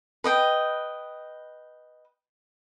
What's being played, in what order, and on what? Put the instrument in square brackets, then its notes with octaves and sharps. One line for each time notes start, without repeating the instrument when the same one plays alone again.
[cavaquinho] B4 D#5 G5